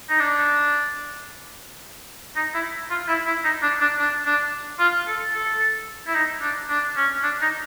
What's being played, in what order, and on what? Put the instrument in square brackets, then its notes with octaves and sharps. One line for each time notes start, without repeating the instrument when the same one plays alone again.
[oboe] D#4
D4
D#4
E4
F4
E4
E4
D#4
D4
D4
D4
D4
F4
A4
A4
E4
D#4
D4
D4
C#4
D4
D#4